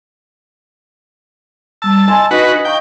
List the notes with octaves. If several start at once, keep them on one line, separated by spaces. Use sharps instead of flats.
G3 A5 E6
D#5 G#5 C6 E6
D4 D#4 F#4 B4 D#5
F5 G5 A#5 C#6